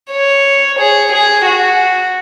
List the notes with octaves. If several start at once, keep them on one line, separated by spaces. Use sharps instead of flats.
C#5
G#4
G#4
F#4